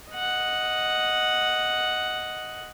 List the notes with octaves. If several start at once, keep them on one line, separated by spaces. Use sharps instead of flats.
D#5 F#5